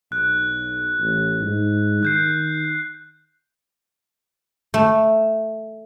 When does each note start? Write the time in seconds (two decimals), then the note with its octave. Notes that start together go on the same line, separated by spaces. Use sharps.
0.12 B1 F#6
0.99 A1
1.41 G#2
2.03 D#3 F#6 G6 C7
4.74 A3